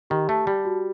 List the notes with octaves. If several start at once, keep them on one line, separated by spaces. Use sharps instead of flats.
D#3 G4
A3 A5
G3 G4
F#4